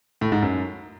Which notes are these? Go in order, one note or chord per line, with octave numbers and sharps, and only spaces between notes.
A2
G#2
F#2